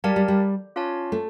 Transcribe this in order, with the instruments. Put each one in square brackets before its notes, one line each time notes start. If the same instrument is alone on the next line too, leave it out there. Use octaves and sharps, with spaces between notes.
[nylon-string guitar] G3 [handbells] G4 A#4 D5 F5 A5
[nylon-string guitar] G3
G3
[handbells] C#4 F4 C#5 F5 A5
[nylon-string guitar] A3